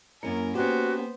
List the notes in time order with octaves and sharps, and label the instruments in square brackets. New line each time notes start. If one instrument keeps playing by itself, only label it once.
[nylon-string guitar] F#2 C#4 E4 [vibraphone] A#3 [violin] A#4
[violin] B3 C5 [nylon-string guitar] C#4 G4 [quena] F#4